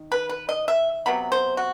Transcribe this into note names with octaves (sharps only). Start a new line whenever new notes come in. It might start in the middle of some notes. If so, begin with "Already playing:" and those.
Already playing: D#3
B4
B4
D#5
E5
C3 F#3 B3 B5
C5
F#4